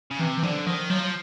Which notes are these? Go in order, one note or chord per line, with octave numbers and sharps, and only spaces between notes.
C#3
C3 E3
E3
D3 F3
D#3 F3
F3 F#3